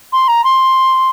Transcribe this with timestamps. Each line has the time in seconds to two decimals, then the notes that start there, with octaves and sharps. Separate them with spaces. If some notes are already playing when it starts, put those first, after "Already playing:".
0.12 C6
0.28 A#5
0.44 C6